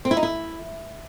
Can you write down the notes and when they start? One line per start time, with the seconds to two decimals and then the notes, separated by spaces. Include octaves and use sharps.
0.05 C4
0.11 E4
0.17 D#4
0.23 E4